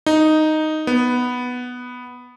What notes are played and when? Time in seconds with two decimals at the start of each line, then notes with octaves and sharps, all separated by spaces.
0.06 D#4
0.87 B3